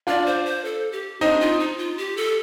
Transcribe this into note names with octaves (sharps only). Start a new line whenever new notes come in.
D4 F4 D5
C5
C5
A4
G4
C4 D4 D#4
F4
D#4
F4
G4
A4